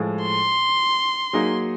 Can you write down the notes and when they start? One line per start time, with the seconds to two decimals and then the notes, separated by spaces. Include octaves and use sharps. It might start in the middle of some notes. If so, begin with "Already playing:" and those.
Already playing: A2 F3 G#3
0.22 C6
1.33 F#3 A#3 D#4 G#4